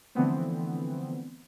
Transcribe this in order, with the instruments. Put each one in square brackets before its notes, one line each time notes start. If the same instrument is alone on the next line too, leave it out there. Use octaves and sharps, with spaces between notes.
[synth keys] D3 E3 F3 A3 B3 C4